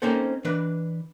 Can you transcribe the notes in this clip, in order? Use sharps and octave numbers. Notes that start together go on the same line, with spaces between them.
A#3 C4 C#4 D#4 A4 C5
E3 D4 B4